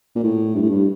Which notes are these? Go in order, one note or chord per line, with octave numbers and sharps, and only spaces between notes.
A#2
A2
G2
A2
G2